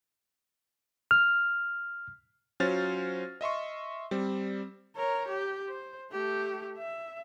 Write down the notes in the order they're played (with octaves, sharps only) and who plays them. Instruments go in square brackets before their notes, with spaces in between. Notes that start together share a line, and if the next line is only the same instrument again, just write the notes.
[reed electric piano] F6
[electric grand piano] F#3 C#4 F4 C5 F6 A6
D#5 E5 C6 C#6
G3 C4
[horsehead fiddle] A#4 C#5
G4
C5
A3 G4
E5